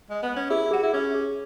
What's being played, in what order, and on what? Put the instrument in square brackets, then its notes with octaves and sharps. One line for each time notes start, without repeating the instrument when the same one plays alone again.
[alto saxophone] G#3
B3
C#4
[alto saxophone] E4 [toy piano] G#4
[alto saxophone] F#4 [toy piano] G#4
[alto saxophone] E4
[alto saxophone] C#4 [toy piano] G#4
[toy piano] G#4